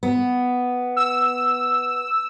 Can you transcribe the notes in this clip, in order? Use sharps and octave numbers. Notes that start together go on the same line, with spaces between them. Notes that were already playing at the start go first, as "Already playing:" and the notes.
B3
E6